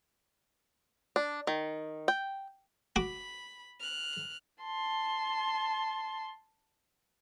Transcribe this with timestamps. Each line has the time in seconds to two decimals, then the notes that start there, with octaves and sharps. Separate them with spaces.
1.16 D4
1.47 D#3
2.08 G5
2.96 F#4 B5 D6
3.80 F6 F#6
4.63 A5 C6